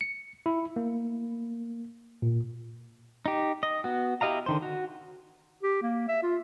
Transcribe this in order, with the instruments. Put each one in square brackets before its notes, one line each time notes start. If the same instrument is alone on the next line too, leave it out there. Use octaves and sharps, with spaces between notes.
[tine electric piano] C#7
E4
A#3
A#2
[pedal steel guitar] D#4 G4
D#5
B3 F#4
E4 G4 D#5 F5 A#5
D3 D#3 C5
F#4
[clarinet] G4
A#3
E5
F4